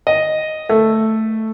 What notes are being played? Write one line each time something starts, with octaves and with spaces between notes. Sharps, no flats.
D#5
A3